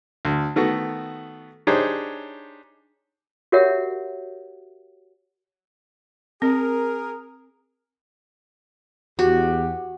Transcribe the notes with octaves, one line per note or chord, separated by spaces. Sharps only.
D2
D#3 A3 B3 F#4
D4 D#4 G4 G#4 C5 C#5
F#4 G4 A#4 C#5 E5 F#5
C4 G#4 A#4
E2 F#4 G4